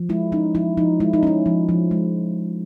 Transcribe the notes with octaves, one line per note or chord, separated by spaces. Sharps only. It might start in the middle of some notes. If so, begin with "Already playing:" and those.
Already playing: F3
G#3 E4
C#4 D#4
F3 E4
F3 D#4
G#3 E4
D#4
C#4 E4
F3
F3
G#3